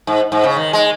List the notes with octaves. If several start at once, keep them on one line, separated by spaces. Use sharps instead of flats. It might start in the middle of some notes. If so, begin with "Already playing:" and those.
G#2
G#2
C#3
D#3
G#3